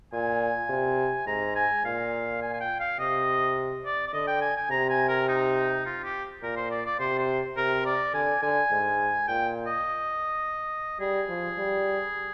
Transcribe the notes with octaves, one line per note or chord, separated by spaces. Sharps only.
A#2 G#5
C3
G#2 A#5
G#5
A#2 F5
G#5
G#5
G5
F5
C3 D#5
D5
D5
D3 D#5
G5
G#5
G#5
C3 A#5
G#5
A#4
D#4
F4
G4
A#2 A#4
C5
D5
D5
C3 C5
C5
C3 A#4
D5
D3 G#5
D3 G#5
G#2
A#2 G5
D#5
G3 G#4
F3
G3